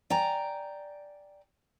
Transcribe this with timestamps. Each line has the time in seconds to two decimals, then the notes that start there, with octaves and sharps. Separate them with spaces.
0.10 D5 G5 G#5 A#5